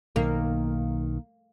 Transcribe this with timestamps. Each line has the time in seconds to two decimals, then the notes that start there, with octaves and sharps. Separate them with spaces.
0.16 B1 D#3 A#3